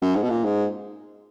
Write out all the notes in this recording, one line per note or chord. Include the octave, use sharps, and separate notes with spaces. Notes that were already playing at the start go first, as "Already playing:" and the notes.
F#2
G#2
B2
A#2
G#2